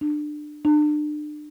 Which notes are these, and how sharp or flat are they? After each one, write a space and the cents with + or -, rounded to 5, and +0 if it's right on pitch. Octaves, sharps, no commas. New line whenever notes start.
D4 +25
D4 +35